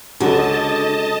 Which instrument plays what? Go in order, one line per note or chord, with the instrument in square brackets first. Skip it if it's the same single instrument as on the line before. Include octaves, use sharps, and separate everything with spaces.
[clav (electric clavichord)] C#2 F#3 [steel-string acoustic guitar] D3 [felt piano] F#4 G#4 A4 [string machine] D#5 A5